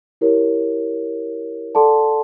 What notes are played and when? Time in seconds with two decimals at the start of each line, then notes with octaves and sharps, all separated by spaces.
0.21 E4 G4 A#4 C#5
1.75 A4 D5 F#5 A5 C6